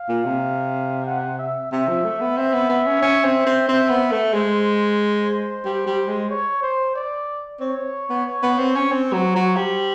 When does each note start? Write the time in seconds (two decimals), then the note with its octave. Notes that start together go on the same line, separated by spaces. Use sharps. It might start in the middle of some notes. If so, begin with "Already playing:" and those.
Already playing: F5
0.09 A#2
0.25 C3
1.06 F#5
1.39 E5
1.72 C3 E5
1.88 F3
2.05 A3
2.21 B3
2.37 C4 E5
2.53 B3
2.69 B3
2.86 C#4
3.02 C#4
3.24 C4
3.46 C4
3.68 C4 E5
3.89 B3
4.11 A3
4.34 G#3 C5
5.65 G3
5.87 G3
6.08 G#3
6.30 C#5
6.63 C5
6.95 D5
7.60 C4 C#5
8.10 B3
8.26 C#5
8.43 B3
8.58 C4
8.76 C#4
8.92 C4 C5
9.13 F#3
9.36 F#3
9.56 G3